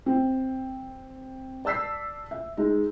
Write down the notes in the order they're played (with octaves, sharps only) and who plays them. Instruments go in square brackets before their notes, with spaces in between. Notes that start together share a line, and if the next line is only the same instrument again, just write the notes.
[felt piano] C4
D5 A5 E6 B6 C7
E5
G#3 D#4